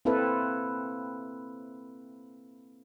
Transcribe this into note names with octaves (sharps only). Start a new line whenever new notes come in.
A#3 C4 E4 A4 B4